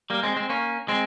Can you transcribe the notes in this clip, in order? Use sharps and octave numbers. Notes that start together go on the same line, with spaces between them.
G3 A#3
G#3 C4
G#3 C4
A#3 C#4
G#3 C4